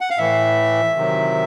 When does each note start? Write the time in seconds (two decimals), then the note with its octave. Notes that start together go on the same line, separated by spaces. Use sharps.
0.01 F#5
0.10 F5
0.18 A2 E3 E5
0.96 C3 D#3 F#3